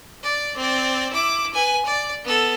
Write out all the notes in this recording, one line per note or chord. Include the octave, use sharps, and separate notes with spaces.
D5
C4 D5
E4 D6
B4 G#5
D5
B3 A4